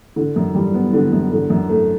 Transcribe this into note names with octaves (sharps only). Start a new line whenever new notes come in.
D3
F#2
G3
B3
D3
F#2
D3
F#2
A3